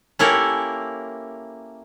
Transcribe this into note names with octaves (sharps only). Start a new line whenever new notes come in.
A#3 C#4 E4 G4 A4 A#4